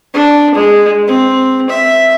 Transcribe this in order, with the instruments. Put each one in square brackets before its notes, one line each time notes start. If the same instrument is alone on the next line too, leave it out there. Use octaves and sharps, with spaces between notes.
[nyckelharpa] D4
G#3
C4
E5